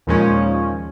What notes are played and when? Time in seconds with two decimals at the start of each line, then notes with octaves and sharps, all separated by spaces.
0.07 D#2 A#2 F3 G#3 C#4